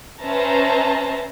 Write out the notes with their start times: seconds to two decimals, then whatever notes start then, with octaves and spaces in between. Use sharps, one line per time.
0.22 C#4 B4 C5 E5 A5 A#5